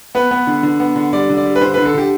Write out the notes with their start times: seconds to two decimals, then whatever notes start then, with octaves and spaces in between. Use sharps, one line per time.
0.15 B3 B4
0.31 B3
0.47 D3
0.63 D3
0.80 B3
0.96 D3
1.13 G3 D5
1.30 D3
1.37 D5
1.45 G3
1.56 B4
1.61 D3 C5
1.74 D3 B4
1.86 A4
1.94 D3 G4